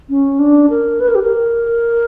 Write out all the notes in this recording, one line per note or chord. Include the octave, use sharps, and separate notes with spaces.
C#4
D4
A#4
B4
A#4
G4
A#4